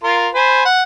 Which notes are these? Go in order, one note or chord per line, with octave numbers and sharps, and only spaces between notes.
F4 A#4 C6
C5 G#5 B5
F#5